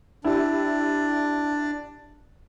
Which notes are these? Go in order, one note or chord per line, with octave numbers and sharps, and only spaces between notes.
D4 E4 G4